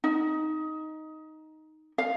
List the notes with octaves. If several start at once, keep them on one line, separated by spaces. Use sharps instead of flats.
D#4
F5